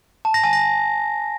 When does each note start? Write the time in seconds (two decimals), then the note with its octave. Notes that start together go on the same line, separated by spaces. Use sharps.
0.25 A5
0.34 A#6
0.44 G#5
0.53 A#6